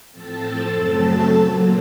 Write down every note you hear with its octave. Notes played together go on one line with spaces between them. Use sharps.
A2 F3 C4 A4 A5
F#2 C#3 F#3 A3 C4
A#2 F#3 A#3